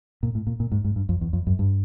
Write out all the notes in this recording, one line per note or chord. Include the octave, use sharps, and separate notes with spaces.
A#2
A2
A#2
A#2
G#2
G#2
G2
F2
E2
F2
F#2
G2